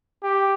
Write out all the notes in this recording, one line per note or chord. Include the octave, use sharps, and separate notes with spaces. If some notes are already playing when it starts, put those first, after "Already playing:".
G4